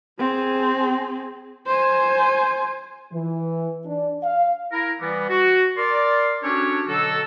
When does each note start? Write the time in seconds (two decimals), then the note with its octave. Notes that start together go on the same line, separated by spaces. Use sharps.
0.19 C4 G#4
1.67 C5 G#5
3.13 E3
3.86 D4
4.23 F5
4.72 E4 A#4
5.00 E3 G3 B3
5.30 F#4
5.77 A#4 D5 C6
6.43 C#4 D4 F#4 G4 A4 C#5
6.88 B2 D3 F#3 F#4 A4